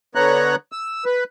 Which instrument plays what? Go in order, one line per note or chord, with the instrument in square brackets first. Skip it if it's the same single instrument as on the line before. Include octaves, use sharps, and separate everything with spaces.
[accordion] D3 B3 C#5 A#5 F#6
E6
B4